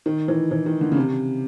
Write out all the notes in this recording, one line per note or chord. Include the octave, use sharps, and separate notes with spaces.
D#3
E3
E3
D#3
D3
C#3
C3